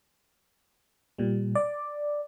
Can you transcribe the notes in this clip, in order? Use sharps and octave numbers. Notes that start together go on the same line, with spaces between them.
A#2 G3
D5